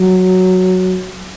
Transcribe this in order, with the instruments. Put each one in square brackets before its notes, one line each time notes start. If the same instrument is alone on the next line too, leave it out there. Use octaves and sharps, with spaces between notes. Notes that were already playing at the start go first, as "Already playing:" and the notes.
Already playing: [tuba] F#3